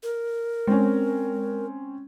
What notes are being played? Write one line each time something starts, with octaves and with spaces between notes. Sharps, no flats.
A#4
G#3 C4 C#4